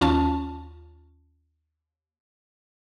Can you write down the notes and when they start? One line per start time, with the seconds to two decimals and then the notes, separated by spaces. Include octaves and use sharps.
0.01 D#2 C#4 F4 A5